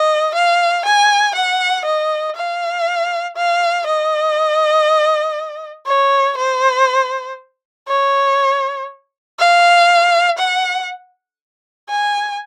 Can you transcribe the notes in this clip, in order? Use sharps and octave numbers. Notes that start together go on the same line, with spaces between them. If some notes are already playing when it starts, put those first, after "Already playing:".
Already playing: D#5
F5
G#5
F#5
D#5
F5
F5
D#5
C#5
C5
C#5
F5
F#5
G#5